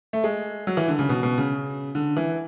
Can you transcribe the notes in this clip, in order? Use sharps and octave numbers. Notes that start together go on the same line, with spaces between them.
A3
G#3
F#3
E3
D3
C#3
B2
B2
C#3
D3
E3